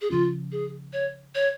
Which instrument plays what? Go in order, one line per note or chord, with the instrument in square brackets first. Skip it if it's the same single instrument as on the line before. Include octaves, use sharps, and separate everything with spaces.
[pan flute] G#4
[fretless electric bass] C#3 F3 C#4 [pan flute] F4
[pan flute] G#4
C#5
C#5